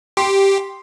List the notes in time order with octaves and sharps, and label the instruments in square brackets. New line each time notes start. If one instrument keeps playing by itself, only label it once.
[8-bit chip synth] G4 [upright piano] C6